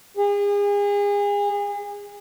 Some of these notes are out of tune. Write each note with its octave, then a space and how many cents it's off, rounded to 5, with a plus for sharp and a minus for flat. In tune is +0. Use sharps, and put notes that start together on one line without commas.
G#4 -35